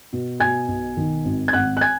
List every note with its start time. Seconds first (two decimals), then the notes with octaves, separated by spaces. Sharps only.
0.13 B2
0.40 B2 G#5 G#6
0.68 B1
0.97 D#3
1.25 G#1
1.48 G#6
1.53 G#1 F#5 F#6
1.77 F#6
1.81 G#5 G#6